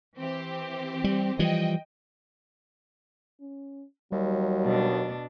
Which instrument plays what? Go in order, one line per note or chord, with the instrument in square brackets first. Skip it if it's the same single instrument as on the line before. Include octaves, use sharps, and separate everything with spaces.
[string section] E3 C4 G4
[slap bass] G3
[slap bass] E3 F3 G3 [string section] D#5 G5
[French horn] C#4
[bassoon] D#2 [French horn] F#3 [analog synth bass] G3
[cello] B2 D4